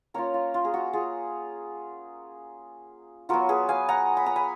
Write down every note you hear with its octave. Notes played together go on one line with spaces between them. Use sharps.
A#3 C#4 F4 A#4 C#5
F4
F4
G#4
F#4
F4 G#4
F#3 B3 F4 F#4 A#4
G#4 B4
F5 G#5
F#5 A#5
B5
A#5
G#5 B5